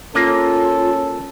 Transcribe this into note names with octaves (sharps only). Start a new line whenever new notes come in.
A#3 C#4 F4 A4